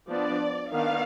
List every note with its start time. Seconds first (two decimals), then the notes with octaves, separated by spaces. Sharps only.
0.10 F3 B3 D4 D5
0.73 D#3 B3 D4 F5